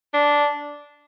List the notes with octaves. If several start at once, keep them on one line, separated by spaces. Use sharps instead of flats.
D4